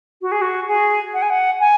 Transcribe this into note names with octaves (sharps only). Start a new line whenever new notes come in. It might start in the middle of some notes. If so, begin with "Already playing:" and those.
F#4
G#4
F#4
G#4
F#5
G#5
F#5
G#5